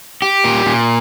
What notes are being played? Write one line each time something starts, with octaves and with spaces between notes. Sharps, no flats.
G4
A#2
A#2